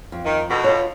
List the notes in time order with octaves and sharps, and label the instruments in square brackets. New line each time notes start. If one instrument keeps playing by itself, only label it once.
[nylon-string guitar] F2
[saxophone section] D#3
D2 B2
[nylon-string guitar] F4 C#5